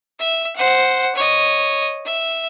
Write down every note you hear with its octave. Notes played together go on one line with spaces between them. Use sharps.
E5
C5 F#5
C#5 D#5
E5